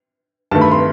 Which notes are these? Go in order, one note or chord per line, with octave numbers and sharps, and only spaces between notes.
G2 D#3 A3 A5
B5
C6